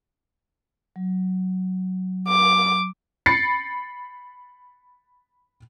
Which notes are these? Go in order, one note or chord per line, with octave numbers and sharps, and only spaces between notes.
F#3
D6
B5 A6 C7 C#7